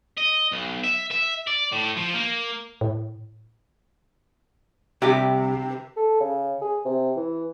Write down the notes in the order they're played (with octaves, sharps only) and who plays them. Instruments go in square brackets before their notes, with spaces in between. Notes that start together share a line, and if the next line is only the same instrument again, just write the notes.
[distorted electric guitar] D#5
B1
E5
E5
D5
A2
F3
A#3
[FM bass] A2
[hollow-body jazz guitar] C2 G4 [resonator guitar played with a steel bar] C3
[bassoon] A4
C#3
G#4
C3
E3